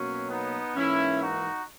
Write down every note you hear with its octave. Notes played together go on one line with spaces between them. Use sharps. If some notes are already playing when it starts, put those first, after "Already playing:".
Already playing: B2 F#3 A#3 C#4
B3 D#4
G#2 E3 A#3 C#4 E4
D#4 F#4